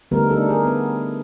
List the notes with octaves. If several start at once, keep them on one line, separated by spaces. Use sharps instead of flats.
D3 G3 A3 B3 D#4 A#4
A3 D4 D#4 A4
G#4 A#4
B3